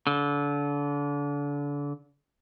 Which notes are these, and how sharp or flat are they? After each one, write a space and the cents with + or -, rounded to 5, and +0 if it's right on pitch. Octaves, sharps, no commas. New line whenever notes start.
D3 -30